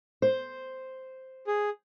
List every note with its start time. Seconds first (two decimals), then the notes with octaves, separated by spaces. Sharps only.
0.22 C5
1.47 G#4